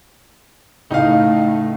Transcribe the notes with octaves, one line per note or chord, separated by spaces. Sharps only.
C#2 A2 A3 D#4 D#5 F5